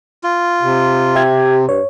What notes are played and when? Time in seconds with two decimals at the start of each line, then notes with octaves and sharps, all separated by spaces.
0.24 F4
0.62 C3
1.16 G4 E5 G#6
1.69 G2 C#5